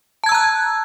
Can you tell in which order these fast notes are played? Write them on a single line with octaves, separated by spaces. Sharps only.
A5 G#6 E6 A#5 F#6